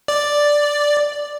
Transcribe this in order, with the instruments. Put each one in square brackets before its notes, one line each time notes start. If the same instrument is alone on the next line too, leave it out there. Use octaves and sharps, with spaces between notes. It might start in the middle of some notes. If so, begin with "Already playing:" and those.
[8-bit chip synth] D5